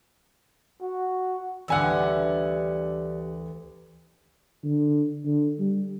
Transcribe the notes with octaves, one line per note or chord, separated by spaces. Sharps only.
F#4
D2 D3 E3 G3 G4 F#5 G#5 E6
D3
D3
G3